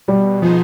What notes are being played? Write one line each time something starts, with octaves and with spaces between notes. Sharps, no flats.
B2 G3
F3 B3 D#4 G#4 C5